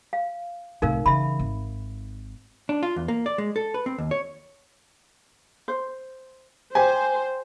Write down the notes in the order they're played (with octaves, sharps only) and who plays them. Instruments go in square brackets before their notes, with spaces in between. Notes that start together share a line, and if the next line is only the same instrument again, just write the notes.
[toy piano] F5
[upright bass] C2 A2 [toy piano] D#4 A#4 F5
[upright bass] C#3 E3 [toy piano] E5 B5
[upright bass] G#1
[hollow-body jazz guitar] D4
F4
E2
A#3
D5
G#3
A4
B4
C4
D#2
C#5
[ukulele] C5
[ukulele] G4 [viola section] C5 [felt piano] G#5